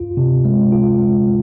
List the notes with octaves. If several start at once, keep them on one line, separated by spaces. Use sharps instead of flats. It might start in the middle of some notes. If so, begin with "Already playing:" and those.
Already playing: F4
C3
G#3
F4
G#3
G#3